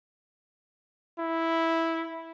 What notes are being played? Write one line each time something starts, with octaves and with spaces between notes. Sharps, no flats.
E4